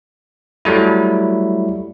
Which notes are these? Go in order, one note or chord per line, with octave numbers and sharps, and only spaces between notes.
F#3 G3 A3 E4